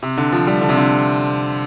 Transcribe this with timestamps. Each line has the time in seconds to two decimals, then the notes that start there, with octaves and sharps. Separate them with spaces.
0.03 C3
0.17 D3
0.33 F3
0.47 G3
0.61 D3
0.69 C3
0.77 D3